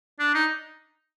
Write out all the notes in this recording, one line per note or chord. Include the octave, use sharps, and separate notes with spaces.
D4
D#4